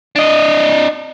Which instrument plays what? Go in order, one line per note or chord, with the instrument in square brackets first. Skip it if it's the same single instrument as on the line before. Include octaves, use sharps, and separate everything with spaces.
[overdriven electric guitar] D4 D#5